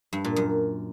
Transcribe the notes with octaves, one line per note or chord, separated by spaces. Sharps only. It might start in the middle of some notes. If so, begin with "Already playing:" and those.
G2
A#2
F#2